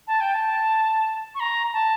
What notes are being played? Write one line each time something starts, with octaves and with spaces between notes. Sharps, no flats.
A5
G5
A5
C#6
A#5
A5